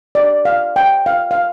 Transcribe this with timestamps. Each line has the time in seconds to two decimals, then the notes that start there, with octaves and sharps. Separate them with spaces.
0.15 D5
0.45 F5
0.76 G5
1.06 F5
1.31 F5